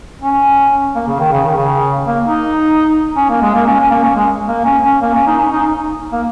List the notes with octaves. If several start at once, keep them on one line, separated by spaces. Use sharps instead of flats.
C#4
A#3
C#3
D#3
C#3
D#3
C#3
A#3
D#4
C#4
A#3
G#3
A#3
C#4
C#4
A#3
C#4
G#3
A#3
C#4
C#4
A#3
C#4
D#4
C#4
D#4
A#3